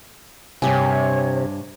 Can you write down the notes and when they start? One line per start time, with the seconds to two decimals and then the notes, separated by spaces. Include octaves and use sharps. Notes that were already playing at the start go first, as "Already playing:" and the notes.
0.62 G2 C3 G4 C#5 G#5